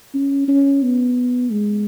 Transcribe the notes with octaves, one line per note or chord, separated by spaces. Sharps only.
C#4
C#4
B3
G#3